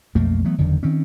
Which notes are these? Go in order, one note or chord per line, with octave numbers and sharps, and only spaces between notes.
B1 F2 A3 A#3
E3 F#3 A3 B3
F#1 E2 D3 D#3
D#3 C4 C#4